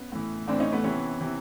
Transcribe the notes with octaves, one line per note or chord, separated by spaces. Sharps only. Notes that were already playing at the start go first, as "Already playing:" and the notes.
Already playing: B3 C#4
A2 E3
A2 E3 C4 D4
C#4 D#4
A3 B3
C3 E3 B3 C#4
C3 E3